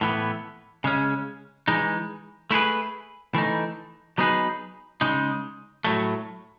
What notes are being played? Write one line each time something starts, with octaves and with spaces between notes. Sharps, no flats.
A2 E3 B3
C#3 G#3 C#4
E3 G#3 D#4
A3 E4 G#4 B4
E3 A3 D#4
F#3 B3 D#4 G#4 B4
C#3 G#3 D#4
A2 F#3 A3